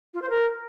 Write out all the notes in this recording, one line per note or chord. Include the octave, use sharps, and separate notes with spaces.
F4
C5
A#4